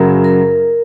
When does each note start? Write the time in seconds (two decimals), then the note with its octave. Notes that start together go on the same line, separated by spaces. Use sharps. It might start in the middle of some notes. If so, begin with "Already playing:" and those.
Already playing: F#2 C#3 F#3 A#4
0.24 A#4